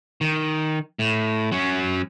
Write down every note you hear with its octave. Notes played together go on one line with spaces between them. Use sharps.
D#3
A2
F#3 C#4